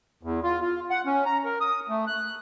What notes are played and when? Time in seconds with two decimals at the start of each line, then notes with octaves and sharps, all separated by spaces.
0.23 E2
0.43 F4
0.61 F4
0.90 F#5
1.06 C#4
1.26 A#5
1.45 A#4
1.60 D#6
1.89 A3
2.07 F#6